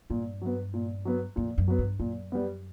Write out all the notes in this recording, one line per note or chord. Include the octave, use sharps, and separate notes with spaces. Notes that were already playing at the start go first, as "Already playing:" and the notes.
G2 A#2
F#3 B3
A#2
F#3 B3
F2 A#2
F#2
F#3 B3
G2
F#2 A#2
G3 B3